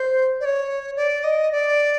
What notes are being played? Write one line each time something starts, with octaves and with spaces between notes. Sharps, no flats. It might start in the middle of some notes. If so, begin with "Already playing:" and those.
Already playing: C5
D5
C#5
D5
D#5
D5